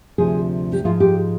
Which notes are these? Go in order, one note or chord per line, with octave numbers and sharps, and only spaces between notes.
D2 C3 F3 G#4
G4
G#2 F3 G#3 F4
G4